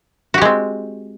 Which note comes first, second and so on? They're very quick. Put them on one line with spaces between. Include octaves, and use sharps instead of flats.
F#4 G4 G#3 C4